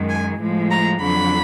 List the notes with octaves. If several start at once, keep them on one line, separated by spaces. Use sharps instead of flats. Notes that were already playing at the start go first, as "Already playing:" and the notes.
Already playing: F#2 D#3 G#3
G#5
A2 F3 G#3
A#5
F2 D3 F#3 B5